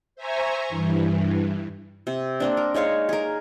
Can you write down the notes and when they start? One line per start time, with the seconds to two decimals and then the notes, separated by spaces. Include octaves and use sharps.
0.15 C5 E5 G#5 A#5 C#6
0.69 G2 E3
2.07 C3
2.40 A#3 C4 D4
2.57 A#4
2.74 G#3 D#4 C#5 F5
3.09 G#4 A#4